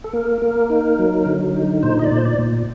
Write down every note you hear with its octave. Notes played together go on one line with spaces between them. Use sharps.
A4
A#3 A#4
A#3
D#4
F#3
D3
D#4
A#2 C5
D#5
D5
A#2
C5
D5
A#2